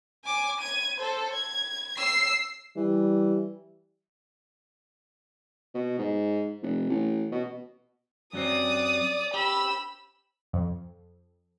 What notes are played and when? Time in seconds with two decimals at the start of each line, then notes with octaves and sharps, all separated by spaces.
0.25 G#5 D6
0.61 G#6 D#7
0.98 A4 C5
1.33 G#6
1.98 E6 C7
2.76 E3 G3
5.74 B2
5.99 G#2
6.62 F1
6.90 A1
7.32 B2
8.33 F#2 F#3 C4 D5 D#6
9.34 G4 B5 E6
10.53 F2